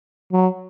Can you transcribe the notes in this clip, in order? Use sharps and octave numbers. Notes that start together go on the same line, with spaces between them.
F#3